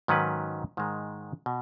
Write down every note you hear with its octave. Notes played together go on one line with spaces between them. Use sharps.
G#2 D#3 F#3 C#4 B4
G#2 D#3 G#3
B2